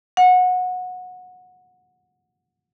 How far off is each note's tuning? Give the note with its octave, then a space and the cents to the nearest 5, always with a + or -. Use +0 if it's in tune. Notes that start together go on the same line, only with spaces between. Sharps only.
F#5 -20